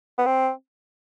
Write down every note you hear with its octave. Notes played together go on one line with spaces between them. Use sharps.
B3
C4